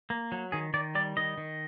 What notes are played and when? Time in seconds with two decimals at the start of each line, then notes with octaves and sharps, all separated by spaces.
0.10 A#3
0.32 F#3
0.52 D#3 G#4
0.74 D#3 D5
0.95 G3 D5
1.17 D#3 D#5
1.38 D#3